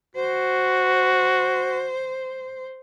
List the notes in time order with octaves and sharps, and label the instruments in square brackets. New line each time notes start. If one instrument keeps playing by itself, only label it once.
[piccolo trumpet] F#4 [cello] C5